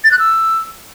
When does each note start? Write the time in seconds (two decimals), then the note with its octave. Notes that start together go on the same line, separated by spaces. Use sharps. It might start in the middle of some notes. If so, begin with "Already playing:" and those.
0.04 A6
0.12 F#6
0.19 E6